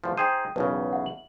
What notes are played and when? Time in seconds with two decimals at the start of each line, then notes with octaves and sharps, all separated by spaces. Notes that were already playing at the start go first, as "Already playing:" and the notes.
0.04 E2 A2 F3
0.17 D#4 G#4 C5 G5 D#6 D#7
0.56 B1 E2 C#3 A#4 B4 C#5
0.93 E5 F#5
1.06 F#7